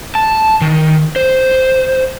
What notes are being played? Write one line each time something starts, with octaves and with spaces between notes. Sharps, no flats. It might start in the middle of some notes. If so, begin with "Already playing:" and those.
A5
D#3
C5